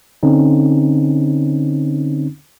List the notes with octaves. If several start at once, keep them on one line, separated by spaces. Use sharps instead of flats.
D3 C4 C#4 D#4